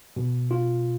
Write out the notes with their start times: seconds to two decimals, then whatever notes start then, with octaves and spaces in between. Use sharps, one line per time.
0.16 B2
0.51 F4